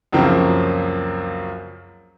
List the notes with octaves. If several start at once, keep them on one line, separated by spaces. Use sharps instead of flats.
C#2 F#2 C#3 F3 A#3 C4